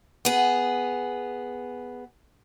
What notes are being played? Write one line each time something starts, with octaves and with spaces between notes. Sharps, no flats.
B3 G#4